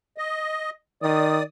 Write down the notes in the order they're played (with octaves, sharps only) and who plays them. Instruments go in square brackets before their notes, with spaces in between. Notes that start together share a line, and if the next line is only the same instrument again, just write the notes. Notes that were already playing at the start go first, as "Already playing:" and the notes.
[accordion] D#5
[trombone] D#3 [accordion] D5 D#6